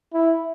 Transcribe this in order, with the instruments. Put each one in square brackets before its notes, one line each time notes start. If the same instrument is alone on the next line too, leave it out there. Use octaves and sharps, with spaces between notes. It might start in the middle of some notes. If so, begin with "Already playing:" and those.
[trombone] E4